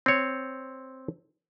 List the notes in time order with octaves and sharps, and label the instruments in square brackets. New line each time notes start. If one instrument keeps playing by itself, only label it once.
[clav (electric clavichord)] C4 C#5